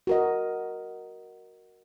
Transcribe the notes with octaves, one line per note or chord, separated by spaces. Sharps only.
F#4 A#4 D#5